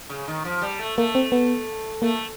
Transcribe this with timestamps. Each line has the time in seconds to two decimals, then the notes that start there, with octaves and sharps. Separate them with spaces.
0.09 C#3
0.28 D#3
0.45 F3
0.62 G3
0.79 A3
0.98 A3 A#3
1.15 C4
1.32 B3
2.02 A3 A#3